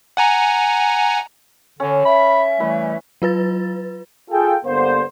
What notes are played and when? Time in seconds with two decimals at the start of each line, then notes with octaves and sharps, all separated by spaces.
0.17 F#5 G#5 A#5
1.80 D3 C#4
2.05 E5 B5
2.60 E3 G3 A3 E4 B4
3.22 F#3 F4 B4 A6
4.31 F4 G#4 A4 G5
4.65 G2 D3 A#3 B3 C5